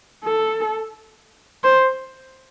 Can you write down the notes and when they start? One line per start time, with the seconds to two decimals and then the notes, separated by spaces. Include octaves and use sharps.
0.25 A4
1.64 C5